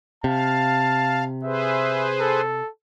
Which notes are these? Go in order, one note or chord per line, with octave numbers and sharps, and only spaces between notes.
C3 F5 A5
G#4 B4 C5 E5
A4